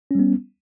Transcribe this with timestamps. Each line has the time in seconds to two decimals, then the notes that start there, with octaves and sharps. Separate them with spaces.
0.11 C#4
0.15 G3
0.19 B3